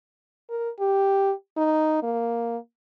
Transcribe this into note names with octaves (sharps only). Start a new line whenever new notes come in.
A#4
G4
D#4
A#3